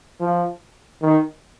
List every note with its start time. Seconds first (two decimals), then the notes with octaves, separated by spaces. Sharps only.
0.20 F3
1.02 D#3